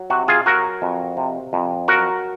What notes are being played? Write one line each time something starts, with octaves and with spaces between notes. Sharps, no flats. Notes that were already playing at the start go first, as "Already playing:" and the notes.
Already playing: F#3
C3 F#4
F4 G#4
F#3 F#4 A#4
F2
C3
F2
F#3 F#4 A#4